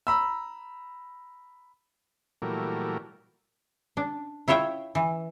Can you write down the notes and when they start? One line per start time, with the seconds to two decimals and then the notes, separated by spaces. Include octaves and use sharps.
0.07 A#5 B5 E6
2.42 A#2 E3 F#3 G3 A3 A#4
3.97 D4
4.48 E4 F4 C#5 E5 G5
4.95 E3